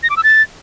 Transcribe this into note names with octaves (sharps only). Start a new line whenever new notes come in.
A#6
D6
E6
A6